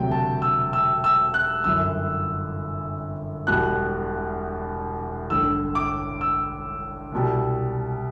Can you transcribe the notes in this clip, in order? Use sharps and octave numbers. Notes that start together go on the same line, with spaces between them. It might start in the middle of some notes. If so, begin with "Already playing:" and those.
Already playing: E1 D2 C3 F#3 G5
A5
E6
E6
E6
F#6
G1 F#2 E3 E6
E1 E2 B2 G3 F#6
A1 G2 D3 E6
D6
E6
C2 B2 G3